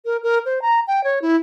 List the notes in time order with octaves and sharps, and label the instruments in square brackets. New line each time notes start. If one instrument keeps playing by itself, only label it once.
[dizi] A#4
A#4
C5
A#5
G5
C#5
E4